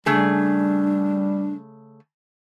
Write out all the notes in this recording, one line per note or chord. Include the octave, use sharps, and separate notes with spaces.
C#3 G3 A3 D4 G#4